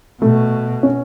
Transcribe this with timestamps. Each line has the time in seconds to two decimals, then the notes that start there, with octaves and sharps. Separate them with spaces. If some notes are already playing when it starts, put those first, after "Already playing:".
0.22 B2 A3
0.83 C#4